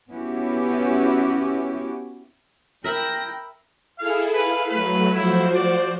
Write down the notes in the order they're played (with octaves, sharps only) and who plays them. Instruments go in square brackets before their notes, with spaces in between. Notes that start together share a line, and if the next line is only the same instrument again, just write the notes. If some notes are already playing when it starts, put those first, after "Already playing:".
[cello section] B3 C#4 E4 F#4 G4
[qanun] A#4 E5 B5 [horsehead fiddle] G5 [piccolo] A#6
[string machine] E4 G#4 A4 [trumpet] F5
[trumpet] B4 [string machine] F5
[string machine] F#3 A3 [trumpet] B4
[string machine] F3 F#4 C5 [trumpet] E4
[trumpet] D5